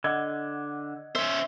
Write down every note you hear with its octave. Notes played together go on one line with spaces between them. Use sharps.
D3 D#5 F#5 G#6
C#4 C5 E5